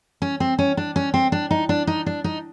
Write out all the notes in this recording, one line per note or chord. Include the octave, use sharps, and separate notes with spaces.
C#4
C4
C#4
D4
C#4
C4
D4
D#4
D4
D#4
D4
D#4